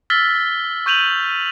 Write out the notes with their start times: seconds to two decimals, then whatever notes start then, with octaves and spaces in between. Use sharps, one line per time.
0.10 E6 F6 A6 B6 G7
0.86 C#6 G6 D#7 F7 F#7